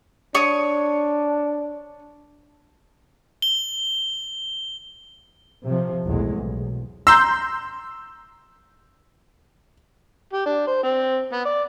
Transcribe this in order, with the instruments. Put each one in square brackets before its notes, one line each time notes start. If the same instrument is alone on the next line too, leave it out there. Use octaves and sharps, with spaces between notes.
[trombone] D4 [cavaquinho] C#5 C#6 D#6
[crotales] G7
[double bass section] C3 F3
B1 E2 A2 G#3
B1
[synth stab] A#5 C6 G6 [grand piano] E6
[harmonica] G4
D4
C5
C4
B3
D5